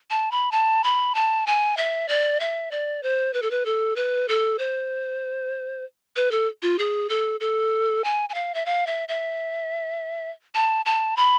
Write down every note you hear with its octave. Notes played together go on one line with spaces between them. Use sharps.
A5
B5
A5
B5
A5
G#5
E5
D5
E5
D5
C5
B4
A4
B4
A4
B4
A4
C5
B4
A4
F4
G#4
A4
A4
G#5
G#5
F5
E5
F5
E5
E5
A5
A5
B5